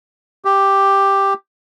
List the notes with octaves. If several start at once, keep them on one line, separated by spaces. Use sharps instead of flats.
G4